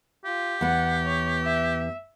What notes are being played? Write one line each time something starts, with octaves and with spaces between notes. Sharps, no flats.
F4 G4
E2 B3 F#5
C#5
E5